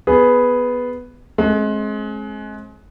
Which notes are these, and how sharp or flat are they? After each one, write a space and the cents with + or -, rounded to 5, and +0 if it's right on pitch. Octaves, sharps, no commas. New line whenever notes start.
B3 +0 G#4 +5
G#3 +30 C4 +45